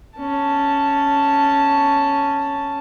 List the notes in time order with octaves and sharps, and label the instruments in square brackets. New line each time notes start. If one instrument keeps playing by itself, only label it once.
[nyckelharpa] C#4 A5